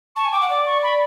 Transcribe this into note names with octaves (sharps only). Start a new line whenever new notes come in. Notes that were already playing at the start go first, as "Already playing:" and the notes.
A5 C#6
G#5
G5 D6
F#5
D5 D6
C#6
B5